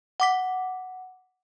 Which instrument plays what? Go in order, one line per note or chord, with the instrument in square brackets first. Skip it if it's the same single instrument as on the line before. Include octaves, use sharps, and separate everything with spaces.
[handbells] F#5 D6 B6